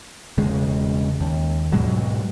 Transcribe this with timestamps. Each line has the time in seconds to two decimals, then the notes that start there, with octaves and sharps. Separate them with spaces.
0.38 E1 C#3 G#3
1.20 D#2
1.72 G#2 B2 F#3 G#3